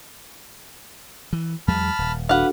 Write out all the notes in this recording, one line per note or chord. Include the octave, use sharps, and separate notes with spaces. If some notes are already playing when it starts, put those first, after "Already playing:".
E3
E2 F#3 G#3 A5 B5 F6
D#1
D4 F#4 A4 B4 F5 F#5